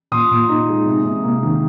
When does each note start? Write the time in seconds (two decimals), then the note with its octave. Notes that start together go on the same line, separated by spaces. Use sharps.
0.12 A#2 C6 D#6
0.31 A#2
0.49 D#4
0.68 G#3
0.86 C3
1.05 C3
1.23 A#3
1.43 D#3